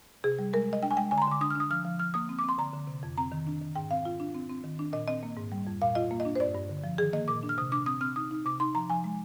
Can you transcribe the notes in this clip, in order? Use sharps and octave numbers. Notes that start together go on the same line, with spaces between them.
C3 G#4
G3
G#3 A#4
G#3
D#5
D4 G5
G#5
G#3 G5
D3 G#5
A#5
C6
D3 D6
D4 D#6
F6
D4 D#6
F3 F6
F3
F3 F6
A#3 D#6
C4
D6
C4
C6
D3 A#5
D3
C3
F2
C4 A#5
D#3
D4
D#3
G#2 G5
C4 F5
F4
D4
C4
C4
D#3
D4
A#2 D#5
C4 D#5
A#3
G#2
G3
F2
A#2 F5
F4 D#5
A#3
D#5
D4
C5
G2 D5
G2
D3
F3
D#3 G#4
A#3 D#5
A#2 D6
D4
F6
C3 D#6
D4 D6
C4 D#6
C4 F6
D#4 D#6
D#4
C3 D6
D#4 C6
F3 A#5
F3 G#5
G#3